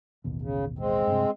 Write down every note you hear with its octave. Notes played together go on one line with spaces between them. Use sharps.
A1 D#2 B2
C#3
G#3 C4
G2 C3